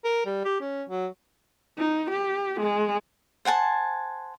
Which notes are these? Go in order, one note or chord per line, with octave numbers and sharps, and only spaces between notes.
A#4
G3
G4
C#4
F#3
D#4
G4
G#3
C5 F#5 G#5 A5